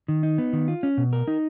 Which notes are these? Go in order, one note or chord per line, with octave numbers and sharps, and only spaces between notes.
D#3
D#4
B3
D#3
F4
C#4
B2
A#4
D#4